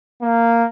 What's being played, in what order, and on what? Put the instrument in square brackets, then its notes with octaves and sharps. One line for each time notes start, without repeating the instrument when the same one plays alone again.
[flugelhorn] A#3